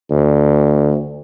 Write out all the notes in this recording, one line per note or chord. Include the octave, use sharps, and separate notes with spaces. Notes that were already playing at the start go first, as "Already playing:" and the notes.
D2